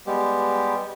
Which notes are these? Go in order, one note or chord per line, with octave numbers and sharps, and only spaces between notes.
G3 G#3 B3 G4